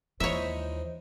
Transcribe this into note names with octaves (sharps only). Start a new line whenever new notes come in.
D#2 E3 G#3 D#4 F4 C5 C#5 E5